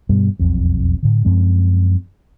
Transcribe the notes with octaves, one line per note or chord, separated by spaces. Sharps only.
G2 B2 G3
E1 B1 F2
A2 D3
F#2 F3 G#3 C4